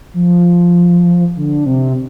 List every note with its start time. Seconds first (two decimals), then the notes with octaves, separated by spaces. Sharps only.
0.14 F3
1.37 D3
1.66 C3